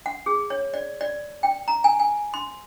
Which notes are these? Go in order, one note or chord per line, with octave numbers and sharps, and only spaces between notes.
F#5
G#4
C#5
D5
D5
G5
A#5
G#5
G#5
C6